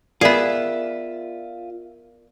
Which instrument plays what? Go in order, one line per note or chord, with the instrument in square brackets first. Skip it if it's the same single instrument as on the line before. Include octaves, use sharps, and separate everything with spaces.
[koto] B3 G#4 [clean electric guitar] F4 E5 [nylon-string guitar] A#4 D5